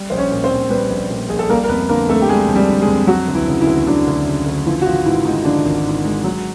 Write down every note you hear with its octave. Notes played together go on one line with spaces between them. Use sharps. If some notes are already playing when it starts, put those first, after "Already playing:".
Already playing: G3
A#1 C5
C#4 C#5
A#2
C4 C5
A#1
G3 B3 B4
A#1
A#2
A#1 G#4
A4
G3 A#3 A#4
A#4
F2 B3 B4
D3 A#3 A#4
F2 A3 A4
G4
G3 G#3 G#4
F2
G3 G4
D3
G#3 G#4
F2
F#3 F#4
D2
E3 E4
C#3
E3 E4
D2
D3 F#3 D4
D2
C#3
D2
E3 F3 E4
F#4
G#1 F3 F4
G#2 E3 E4
D#3 G#3 D#4
D3 F3 D4
G#1
G#2
G#3
F#3